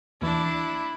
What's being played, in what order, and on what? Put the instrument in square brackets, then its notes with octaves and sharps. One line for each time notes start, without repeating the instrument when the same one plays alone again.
[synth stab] D#2 E3 [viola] D4 E4